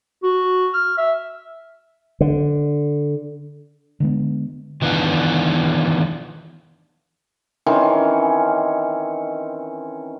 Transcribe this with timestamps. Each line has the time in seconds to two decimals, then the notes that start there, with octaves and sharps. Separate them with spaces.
0.23 F#4
0.74 F6
0.98 E5
2.21 D3
4.00 D3 G#3 B3
4.82 D#3 E3 B3 D4 F4
7.66 D#3 E3 C4 C#4